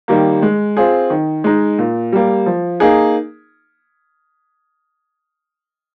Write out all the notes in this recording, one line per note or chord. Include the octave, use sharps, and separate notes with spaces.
D#3 G3 A#3
G#3
C4 F4 G#4
D#3
G#3 D#4
A#2
G3 A#3
F3
A#3 D#4 G#4